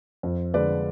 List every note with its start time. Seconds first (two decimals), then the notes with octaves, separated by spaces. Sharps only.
0.23 F2
0.54 D3 G#3 B4 D5